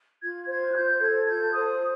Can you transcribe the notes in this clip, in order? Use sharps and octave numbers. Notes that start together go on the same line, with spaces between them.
F4 G#6
C5 G#6
F#6
F4 G6
A4 G#6
G#6
F4 G6
C5 D#6